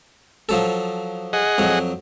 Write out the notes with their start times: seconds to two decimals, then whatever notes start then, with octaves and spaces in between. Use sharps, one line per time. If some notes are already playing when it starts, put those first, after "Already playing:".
0.49 F3 F#3 A4
1.33 G#4 D#5 F#5
1.58 F2 F#3